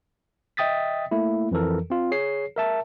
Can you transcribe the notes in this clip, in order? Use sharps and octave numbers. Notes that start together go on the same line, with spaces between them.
D#5 E5 G5 D#6 A6 B6
A3 A#3 E4
F2 E3 F3 A4 A#4
C4 F4
G#4 C#5 C7
A#4 E5 A5